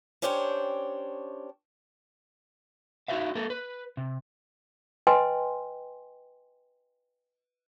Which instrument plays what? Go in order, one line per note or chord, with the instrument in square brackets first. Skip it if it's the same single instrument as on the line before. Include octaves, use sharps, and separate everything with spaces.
[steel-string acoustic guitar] C#4 D4 G4 C5 C#5 G5
[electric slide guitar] D#4 F#4 G4 C5 E5 F5
A#3 A4 A#4
B4
C3
[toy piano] B4 D#5 G5 G#5 C6